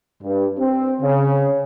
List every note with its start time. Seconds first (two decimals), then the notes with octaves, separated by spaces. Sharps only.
0.23 G2
0.59 C4
1.01 C#3